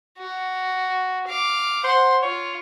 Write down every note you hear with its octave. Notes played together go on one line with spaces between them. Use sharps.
F#4
F5 D6
C5 F#5 C6
F4 C#5